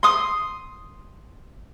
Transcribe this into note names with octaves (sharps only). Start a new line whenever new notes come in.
C6 D#6